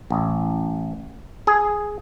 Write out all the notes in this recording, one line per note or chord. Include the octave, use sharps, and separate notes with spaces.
A1
G#4